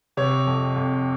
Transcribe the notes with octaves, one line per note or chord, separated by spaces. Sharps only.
C3 C#5
F2
F2